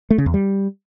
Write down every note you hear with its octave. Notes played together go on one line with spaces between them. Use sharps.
A3
C#3
E2
G3